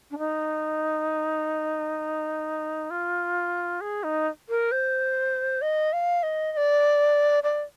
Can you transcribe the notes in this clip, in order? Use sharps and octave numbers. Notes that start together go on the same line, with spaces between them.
D4
D#4
F4
G#4
D#4
A#4
C5
D#5
F5
D#5
D#5
D5
D5